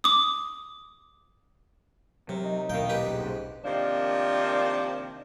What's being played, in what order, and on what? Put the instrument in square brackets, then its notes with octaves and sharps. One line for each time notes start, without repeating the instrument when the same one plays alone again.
[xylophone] D6 D#6
[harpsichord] C3 [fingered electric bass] F#3 [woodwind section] A#4
[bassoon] D#4
[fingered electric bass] D#1 B1 [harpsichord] D#3 G5 [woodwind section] E4 D#5 F5
[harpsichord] G4 B4
[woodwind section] G#2
[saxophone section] C3 D#3 F3 A#3 D4